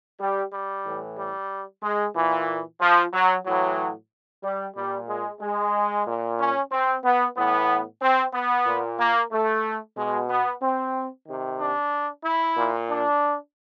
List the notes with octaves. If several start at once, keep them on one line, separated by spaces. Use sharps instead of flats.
G3
G3
A2 E3
G3
G#3
A#2 E3
F3
F#3
A2 E3 F#3
G3
A#2 G3
G#3
G#3
A#2
C#4
C4
B3
A2 E3 B3
C4
B3
A#2
A#3
A3
B2 G#3
B3
C4
C3 D#3
D4
E4
A#2
D4